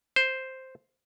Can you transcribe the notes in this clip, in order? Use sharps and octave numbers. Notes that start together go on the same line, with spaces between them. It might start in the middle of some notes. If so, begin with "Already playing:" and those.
C5